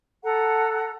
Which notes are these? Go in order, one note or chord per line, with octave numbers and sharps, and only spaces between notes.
A4 F#5 A#5